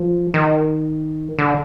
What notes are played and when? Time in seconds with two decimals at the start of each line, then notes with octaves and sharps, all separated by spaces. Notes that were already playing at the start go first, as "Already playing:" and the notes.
Already playing: F3
0.34 D#3
1.39 D3